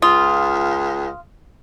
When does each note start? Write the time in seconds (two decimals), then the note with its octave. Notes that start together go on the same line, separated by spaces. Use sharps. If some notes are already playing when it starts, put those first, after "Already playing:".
0.02 C#2 F4 D#6